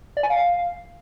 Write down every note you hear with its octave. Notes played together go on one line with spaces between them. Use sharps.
D5
G#5
F5